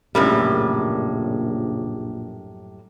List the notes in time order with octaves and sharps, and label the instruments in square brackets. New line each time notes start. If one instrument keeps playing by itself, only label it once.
[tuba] A#1 [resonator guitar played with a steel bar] F#2 A2 G3 [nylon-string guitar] C#3 A3 A#4